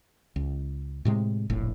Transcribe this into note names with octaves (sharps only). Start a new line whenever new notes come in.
C#2
A2 C3 G#3
F1 A#1 A2